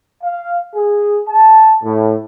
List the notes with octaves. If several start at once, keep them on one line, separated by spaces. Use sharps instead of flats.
F5
G#4
A5
A2